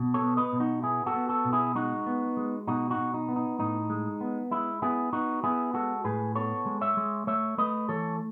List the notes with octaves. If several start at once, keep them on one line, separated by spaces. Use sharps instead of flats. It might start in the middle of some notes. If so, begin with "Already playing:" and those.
Already playing: B2
A4 C#5
B3
B4 D#5
B2
D#4 F#4
B3 E4 G#4
F#4 A4
B3
F#4 A4
B2
E4 G#4
G#3 D#4 F#4
B3
G#3
B2 D#4 F#4
D#4 F#4
B2
D#4
B3
D#4
A2 D#4
G#3
B3
G#3 E4
B3 E4 G#4
B3 D#4 F#4
B3 E4 G#4
G#3 F#4 A4
A2 G#4 B4
B3 A4 C#5
G#3
C#5 E5
G#3
A3 C#5 E5
A3 B4 D#5
E3 A4 C#5